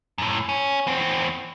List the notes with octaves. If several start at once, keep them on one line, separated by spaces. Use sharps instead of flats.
F#2 A2
C#4
E2 C4